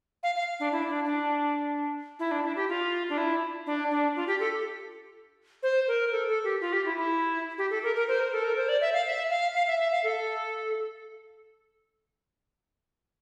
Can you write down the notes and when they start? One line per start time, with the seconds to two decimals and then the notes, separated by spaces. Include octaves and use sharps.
0.23 F5
0.35 F5
0.60 D4
0.72 E4
0.89 D4
1.05 D4
2.19 E4
2.31 D4
2.44 E4
2.56 G4
2.69 F4
3.09 D4
3.18 E4
3.66 D4
3.91 D4
4.16 F4
4.27 G4
4.40 A4
5.63 C5
5.88 A#4
6.12 A4
6.28 A4
6.44 G4
6.61 F4
6.73 G4
6.86 E4
6.97 E4
7.58 G4
7.71 A4
7.83 A#4
7.96 A#4
8.08 C5
8.20 A#4
8.33 A4
8.44 A#4
8.57 C5
8.69 D5
8.81 E5
8.93 F5
9.06 E5
9.30 F5
9.54 F5
9.67 E5
9.80 E5
9.92 F5
10.04 A4